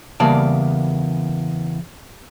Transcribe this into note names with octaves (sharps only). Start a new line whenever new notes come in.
E2 C#3 G3 A#3 D5 A5